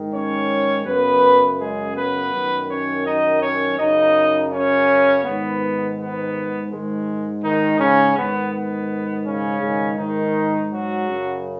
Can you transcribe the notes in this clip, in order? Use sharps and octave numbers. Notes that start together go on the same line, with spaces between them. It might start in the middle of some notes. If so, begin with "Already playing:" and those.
Already playing: G#2 D#3
C#4 C#5
F#2 C#3 B3 B4
G#3 G#4
B3 B4
F#2 D#3
C#4 C#5
D#4 D#5
C#4 C#5
F#2 C#3 D#4 D#5
C#4 C#5
G#2 D#3 B3
B3
G#2 D#3 G#3
D#3 D#4
C#3 C#4
G#2 D#3 B3
B3
C#3 C#4
G#2 D#3
D#3 D#4
F#3 F#4
F#2 C#3